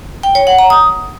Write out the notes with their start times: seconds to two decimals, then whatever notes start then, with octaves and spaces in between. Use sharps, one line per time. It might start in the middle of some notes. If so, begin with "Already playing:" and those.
0.23 G5
0.35 C#5
0.47 F#5
0.59 A#5
0.70 D#6